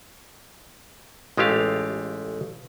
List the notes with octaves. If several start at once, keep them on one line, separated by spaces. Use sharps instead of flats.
A1 G#3 A3 F4 G4 F5